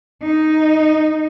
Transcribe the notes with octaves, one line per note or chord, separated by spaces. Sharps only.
D#4